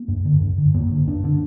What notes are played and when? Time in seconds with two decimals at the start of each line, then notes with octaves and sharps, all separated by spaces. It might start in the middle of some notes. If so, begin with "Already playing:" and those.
Already playing: A#3
0.08 G2
0.25 D3
0.41 G2
0.58 D3
0.74 G2 A#3
0.91 D3
1.07 G2 D4
1.24 D3 D4